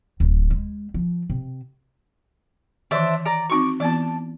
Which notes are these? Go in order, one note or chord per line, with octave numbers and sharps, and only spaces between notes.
D1
G#3
F3
C3
D#3 E3 D4 C5 E5
D5 A#5 D6
C4 D#4 F#4 C#6 D6
E3 B3 E4 D5 A5